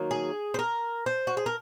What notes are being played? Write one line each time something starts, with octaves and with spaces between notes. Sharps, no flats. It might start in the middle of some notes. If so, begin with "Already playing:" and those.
Already playing: D#3 F#3 A#3
G#4
C5
A#4
C5
F#4
G#4
A#4